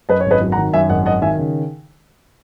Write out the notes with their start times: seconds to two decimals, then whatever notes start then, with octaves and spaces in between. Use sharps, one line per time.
0.09 F#2 B4 D#5
0.20 C#5
0.26 G#1 B4 D#5
0.41 F#3
0.52 F#5 A#5
0.58 D#3
0.73 F#2 E5 G#5
0.89 G#1 D#5 F#5
1.06 F#3 D#5 F#5
1.22 D#3 E5 G#5
1.38 C#3